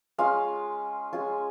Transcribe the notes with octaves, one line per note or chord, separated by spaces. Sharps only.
G#3 C#4 F4 F5
G#3 C#4 F4